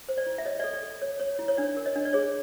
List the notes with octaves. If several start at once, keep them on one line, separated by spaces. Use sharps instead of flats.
C5
D5
E4
E5
C#5 D#5
A4 D5 E5
D5
A4
D5
C#5
C#5
E4
C#5
D4 D5
A#4
C#5 D#5
D4
D5
G#4 C#5